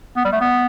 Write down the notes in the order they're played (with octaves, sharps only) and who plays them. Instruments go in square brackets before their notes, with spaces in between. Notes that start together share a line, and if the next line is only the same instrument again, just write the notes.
[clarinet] B3
G3
A3
B3